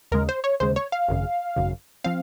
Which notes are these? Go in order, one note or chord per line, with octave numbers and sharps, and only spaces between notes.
D#2 C#3 G#3 A#4
C5
C#5
D#2 C#3 G#3 C5
C#5
F5
G#1 F#2 C#3
G#1 F#2 C#3
F3 C4 F5